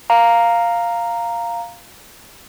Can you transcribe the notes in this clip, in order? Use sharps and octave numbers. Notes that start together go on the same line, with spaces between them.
F5 A#5